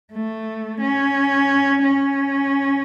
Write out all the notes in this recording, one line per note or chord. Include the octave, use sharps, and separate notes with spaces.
A3
C#4
C#4